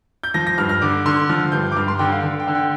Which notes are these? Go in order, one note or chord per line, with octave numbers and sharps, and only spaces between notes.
G6
F3 A#6
A#6
G2 F6
F6
D3 D6
D3 C6
F3 F6
G2 G6
D6
G2 F6
C6
D3 G5
F5
D3
G5
D3
G5